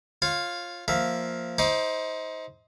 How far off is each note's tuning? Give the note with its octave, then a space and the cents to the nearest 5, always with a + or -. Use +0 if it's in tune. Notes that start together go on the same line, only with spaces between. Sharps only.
F4 +0 C#5 -30
F3 +0 A#3 +0 E5 +0
D#4 +30 C5 +0 D6 +0